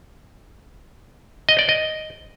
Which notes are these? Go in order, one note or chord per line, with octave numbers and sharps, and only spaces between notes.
D#5
D5
D#5